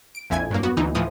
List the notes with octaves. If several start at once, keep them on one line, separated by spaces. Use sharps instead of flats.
D7
A#1 F2 E4 G#5 G#6
G2 F#3 A#3
B3 F#4
D2 E3 D#4
A2 E3 F3 D#6